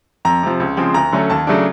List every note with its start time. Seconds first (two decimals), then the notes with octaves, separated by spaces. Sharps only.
0.25 F2 A#5
0.43 C3 F3
0.60 C#2
0.77 C#3 F3 G#3 C4
0.94 D2 A#5
1.12 D3 F#3 A3 C#4
1.30 D#2 A5
1.47 C#3 F#3 A3 D4